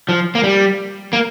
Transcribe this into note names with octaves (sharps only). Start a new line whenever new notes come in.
F3
A#3
G3
A#3